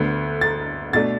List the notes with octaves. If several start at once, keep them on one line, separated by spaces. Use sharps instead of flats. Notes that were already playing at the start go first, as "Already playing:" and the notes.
Already playing: D2 D3 B3
A6
B2 A3 D4 A6